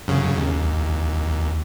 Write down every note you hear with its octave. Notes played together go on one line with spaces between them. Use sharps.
F#2 C#3
D#2